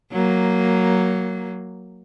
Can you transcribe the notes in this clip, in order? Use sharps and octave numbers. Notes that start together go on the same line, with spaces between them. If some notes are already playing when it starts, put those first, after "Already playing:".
F#3 A#3